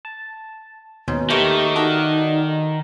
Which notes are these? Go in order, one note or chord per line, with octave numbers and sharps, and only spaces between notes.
A5
D#2 G#2 B2 C#4
D#3 A3 A#3 G4 B4 C#6 G6
D#4 F#4 A4 D5 D#5